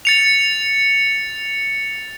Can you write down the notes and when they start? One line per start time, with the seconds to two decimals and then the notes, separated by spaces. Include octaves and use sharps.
0.05 A6 C#7 F7